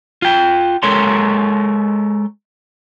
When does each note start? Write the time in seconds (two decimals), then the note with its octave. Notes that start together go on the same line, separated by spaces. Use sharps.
0.22 F4 G5
0.83 G#3 A4 A#4 C#5 C6